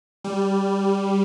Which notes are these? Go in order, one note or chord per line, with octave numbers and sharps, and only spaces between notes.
G3